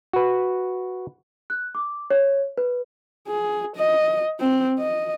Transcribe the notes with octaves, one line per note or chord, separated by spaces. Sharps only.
F#4 B4
F#6
D6
C#5
B4
G#4
D#5
C4
D#5